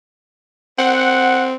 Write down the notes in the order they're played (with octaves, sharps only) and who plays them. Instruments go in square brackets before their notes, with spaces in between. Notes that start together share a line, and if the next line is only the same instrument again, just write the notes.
[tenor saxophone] C4 [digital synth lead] F#5